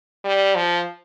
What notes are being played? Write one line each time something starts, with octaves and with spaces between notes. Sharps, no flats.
G3
F3